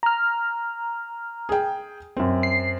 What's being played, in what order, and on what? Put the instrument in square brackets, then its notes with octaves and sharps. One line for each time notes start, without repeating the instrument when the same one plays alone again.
[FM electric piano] A#5 F6
[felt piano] G#4 G5
F#2 C4
[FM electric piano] C7